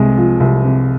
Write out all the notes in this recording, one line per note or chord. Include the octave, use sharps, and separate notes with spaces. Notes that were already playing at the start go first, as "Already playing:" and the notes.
Already playing: C2 C3 G#3
F3
C2
C3